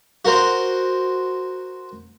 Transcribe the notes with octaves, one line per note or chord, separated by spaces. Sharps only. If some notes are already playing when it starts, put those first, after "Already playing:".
F#4 A#4 C5